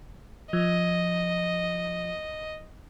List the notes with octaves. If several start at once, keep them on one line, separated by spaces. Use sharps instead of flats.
F3 D#5